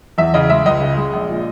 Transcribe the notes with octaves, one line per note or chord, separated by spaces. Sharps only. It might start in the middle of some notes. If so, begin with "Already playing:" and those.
E2 E5
C#3 D#5
G#3 E5
C#2 D#5
C#3
G#3
A#1
A#2